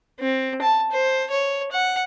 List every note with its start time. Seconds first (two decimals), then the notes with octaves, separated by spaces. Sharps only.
0.20 C4
0.62 A5
0.92 C5
1.30 C#5
1.71 F#5